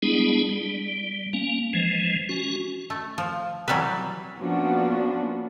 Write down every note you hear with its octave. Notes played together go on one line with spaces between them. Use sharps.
G3 G#3 B3 D4 E4 G#4
G3
A#3 C#4
E3 F3 G#3
C#4 F#4
A3
F3
E3 F#3 G3 C4 B4
F3 A#3 B3 C#4 D4 F#4